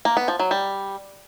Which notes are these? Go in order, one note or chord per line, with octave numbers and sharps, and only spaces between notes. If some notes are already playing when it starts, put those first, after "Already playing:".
A#3
B3
F3
F#3
G3